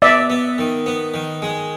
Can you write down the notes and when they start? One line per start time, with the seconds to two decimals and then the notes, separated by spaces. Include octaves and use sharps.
0.02 B3 D5 E5
0.30 B3
0.58 D#3
0.86 B3
1.14 D#3
1.42 G#3